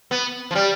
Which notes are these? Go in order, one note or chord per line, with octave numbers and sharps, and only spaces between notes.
B3
F3
G3